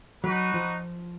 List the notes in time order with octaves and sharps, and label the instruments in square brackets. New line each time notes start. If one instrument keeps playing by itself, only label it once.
[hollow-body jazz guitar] F#3 [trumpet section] D#4 F#4 B4
[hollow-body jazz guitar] F3